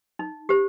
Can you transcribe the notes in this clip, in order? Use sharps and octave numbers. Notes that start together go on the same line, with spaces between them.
D#4
G4 C5